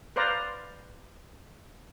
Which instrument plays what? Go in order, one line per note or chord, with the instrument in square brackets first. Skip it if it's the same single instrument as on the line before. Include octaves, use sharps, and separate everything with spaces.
[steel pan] B4 C5 D5 F5 A#5